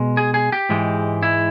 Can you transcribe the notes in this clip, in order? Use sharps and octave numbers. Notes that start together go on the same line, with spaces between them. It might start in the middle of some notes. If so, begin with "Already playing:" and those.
Already playing: B2 G#3
G#4
G#4
G4
G#2 E3 G#3
E4